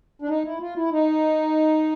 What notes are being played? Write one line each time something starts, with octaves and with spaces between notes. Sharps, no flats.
D4
D#4
E4
F4
E4
D#4